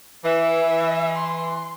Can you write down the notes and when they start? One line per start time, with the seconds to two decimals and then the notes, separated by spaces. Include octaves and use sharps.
0.25 E3 E5
1.17 C6